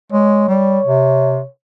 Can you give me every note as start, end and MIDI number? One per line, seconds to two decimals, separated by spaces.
0.12 0.48 56
0.12 1.48 73
0.49 0.79 55
0.85 1.41 48